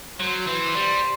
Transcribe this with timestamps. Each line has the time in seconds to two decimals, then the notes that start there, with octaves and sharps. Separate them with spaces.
0.20 F#3 C5
0.47 E3
0.75 G3